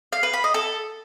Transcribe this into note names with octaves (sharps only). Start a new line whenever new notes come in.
F5
B4
B5
D#5
A4